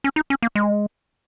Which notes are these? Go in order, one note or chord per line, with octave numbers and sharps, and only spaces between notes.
C#4
D#4
C#4
A#3
G#3